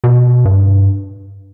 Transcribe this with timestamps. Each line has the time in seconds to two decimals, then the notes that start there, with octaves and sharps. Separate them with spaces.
0.04 B2
0.45 G2